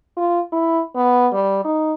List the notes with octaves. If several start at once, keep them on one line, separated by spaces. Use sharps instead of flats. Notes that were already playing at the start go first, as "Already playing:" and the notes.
F4
E4
B3
G3
D#4